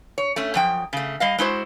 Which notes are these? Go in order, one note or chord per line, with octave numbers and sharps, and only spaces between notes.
C#5
A3 C#4
F#2 F3 G5
C#3 A3
G3 D#5 F5
G#3 E4 F#4 C5